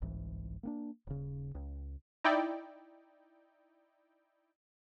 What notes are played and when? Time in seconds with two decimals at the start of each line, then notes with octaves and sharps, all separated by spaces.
0.02 G1 C2 G#2 E3
0.63 A#3 B3 D4
1.07 D#1 C#3
1.55 C#2
2.24 D#4 E4 D5 G5